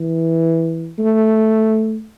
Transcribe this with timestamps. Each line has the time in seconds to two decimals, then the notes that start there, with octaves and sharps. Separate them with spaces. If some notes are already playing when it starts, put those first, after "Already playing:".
Already playing: E3
0.99 A3